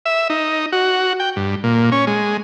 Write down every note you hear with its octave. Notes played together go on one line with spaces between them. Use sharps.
E5
D#4
F#4
G5
G2
A#2
C#4
G#3